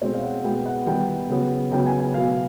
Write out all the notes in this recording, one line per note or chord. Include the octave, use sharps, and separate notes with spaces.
B2 G#3 C4 C#5
F5
F#5
B2 G#3 B3 G5
F#5
D#3 G3 B3 G5
C#3 F#3 B3
C#3 F#3 B3 G5
G#5
G#5
B2 F#3 B3 F5